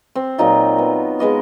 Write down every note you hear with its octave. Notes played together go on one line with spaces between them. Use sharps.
C4
A#2 F#3 D#4 F4
B3
G#3 B3 D#5 F5